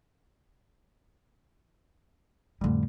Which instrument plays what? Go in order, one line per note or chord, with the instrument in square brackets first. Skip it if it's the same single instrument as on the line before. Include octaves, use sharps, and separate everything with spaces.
[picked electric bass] F2 D3 G3 [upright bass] A2 F3